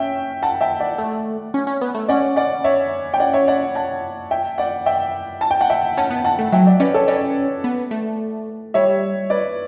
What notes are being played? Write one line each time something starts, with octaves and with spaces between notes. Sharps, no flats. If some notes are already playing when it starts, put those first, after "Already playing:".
Already playing: C#4 E5 G5
F#5 A5
E5 G5
D5 F#5
A3
C#4
C#4
B3
A3
C#4 D5 F#5
D5 F#5
C#5 E5
G5
D5 F#5
C#5 E5
D5 F#5
F#5 A5
E5 G5
D5 F#5
E5 G5
A5
G5
F#5
E5 G5
C#4 F#5 A5
B3
F#5 A5
A3
F#3 E5 G5
D5 F#5
C#4 B4 D5
A4 C#5
C#4 B4 D5
B3
A3
G3 C#5 E5
B4 D5